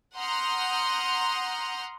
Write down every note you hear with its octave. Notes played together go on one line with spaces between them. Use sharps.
F#5 A#5 C6 D#6 F6 G6